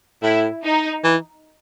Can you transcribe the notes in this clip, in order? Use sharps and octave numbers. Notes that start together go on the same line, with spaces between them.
A2 E4
D#4
E3